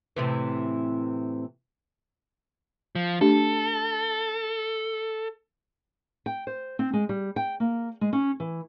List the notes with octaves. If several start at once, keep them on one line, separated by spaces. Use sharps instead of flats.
A2 C3 E3
F3
A3 D4 G4 A4
G5
C5
C4
G#3
G3
G5
A#3
G#3
C#4
E3